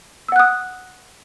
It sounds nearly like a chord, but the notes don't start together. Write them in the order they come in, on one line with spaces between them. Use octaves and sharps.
E6 F#5 F#6 D#6